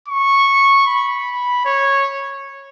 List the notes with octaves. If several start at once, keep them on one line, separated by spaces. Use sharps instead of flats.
C#6
B5
C#5